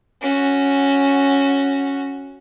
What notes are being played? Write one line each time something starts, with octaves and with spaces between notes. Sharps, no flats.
C#4 F#4